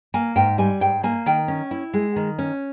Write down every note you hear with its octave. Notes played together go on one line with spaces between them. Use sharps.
A#3 G#5
G#2 G5
G3 G#5
G#2 G5
A#3 G#5
D#3 G5
C#4
E4
G#3
D#3
C#4